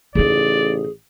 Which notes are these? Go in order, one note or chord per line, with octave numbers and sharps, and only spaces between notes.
A1 C#3 D#4 G#4 D5